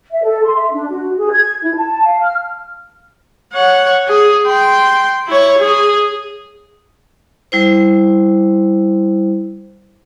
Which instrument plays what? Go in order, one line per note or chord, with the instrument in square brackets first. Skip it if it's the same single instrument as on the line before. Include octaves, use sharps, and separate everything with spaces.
[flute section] E5
A4
C6
E5
D4
F#4
G#4
G#6
E4
A5
F5
F6
[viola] C#5 F#5
G#4
G5 C6
E4 C#5
G#4
[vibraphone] G3 E4 C5